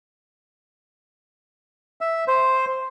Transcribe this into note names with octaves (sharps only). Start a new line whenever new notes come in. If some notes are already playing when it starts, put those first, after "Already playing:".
E5
C5